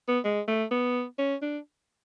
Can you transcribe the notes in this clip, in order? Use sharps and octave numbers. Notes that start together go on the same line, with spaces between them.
B3
G#3
A3
B3
C#4
D4